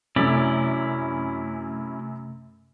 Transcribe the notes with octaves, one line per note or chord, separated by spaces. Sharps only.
F#2 C3 A3 C#4 E4 D5 E6 B6